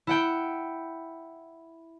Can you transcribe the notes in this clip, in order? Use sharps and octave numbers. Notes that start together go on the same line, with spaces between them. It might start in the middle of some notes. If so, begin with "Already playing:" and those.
E4 F#5 G5